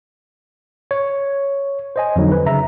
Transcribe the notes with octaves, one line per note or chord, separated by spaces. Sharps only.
C#5
C5 D#5 G#5
F2 D3 F#3 D#4
B4
C#3 E5 A#5